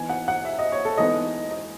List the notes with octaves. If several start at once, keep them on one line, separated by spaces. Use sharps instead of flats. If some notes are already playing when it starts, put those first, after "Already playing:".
Already playing: E3 B3 D#4 G#5
F#5
F#5
E5
D#5
C#5
A4
E3 G#3 B3 D#4 D#5
D#5